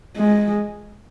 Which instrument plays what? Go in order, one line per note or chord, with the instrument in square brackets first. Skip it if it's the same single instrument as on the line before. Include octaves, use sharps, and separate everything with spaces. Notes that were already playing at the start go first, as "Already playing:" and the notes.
[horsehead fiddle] G#3